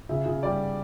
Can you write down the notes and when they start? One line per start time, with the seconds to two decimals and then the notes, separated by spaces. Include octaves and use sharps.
0.09 C#3 E5
0.26 C#3
0.43 G3 D5